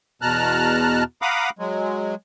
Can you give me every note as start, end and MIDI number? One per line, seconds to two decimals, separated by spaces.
0.22 1.03 40
0.22 1.03 47
0.22 1.03 81
0.22 1.03 82
0.22 1.03 89
0.22 1.03 90
1.22 1.50 77
1.22 1.50 78
1.22 1.50 82
1.22 1.50 83
1.22 1.50 86
1.22 1.50 87
1.59 2.15 54
1.59 2.15 56